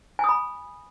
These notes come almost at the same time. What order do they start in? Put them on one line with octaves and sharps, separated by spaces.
G#5 D#6 B5